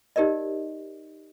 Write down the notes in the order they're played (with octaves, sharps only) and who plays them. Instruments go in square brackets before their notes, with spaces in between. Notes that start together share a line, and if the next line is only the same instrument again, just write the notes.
[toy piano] D#4 G4 A#4 D5 D#5